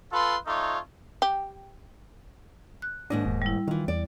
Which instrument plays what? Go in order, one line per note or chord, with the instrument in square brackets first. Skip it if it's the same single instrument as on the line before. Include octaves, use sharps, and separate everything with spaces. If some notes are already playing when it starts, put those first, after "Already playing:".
[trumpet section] F4 A4 B4 C6
A3 D#4 F4 C#5
[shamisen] G4
[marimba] F#6
[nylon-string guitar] D#2 G#2 D#5 [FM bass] D4
[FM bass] E1
[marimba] G3 E4
[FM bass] D#3 [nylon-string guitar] E3 F4
[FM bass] E2 [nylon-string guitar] D5